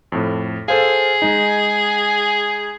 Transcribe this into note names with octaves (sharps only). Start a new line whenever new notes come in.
F2 A2
G#4 A4 C5 F5
G#3 D#4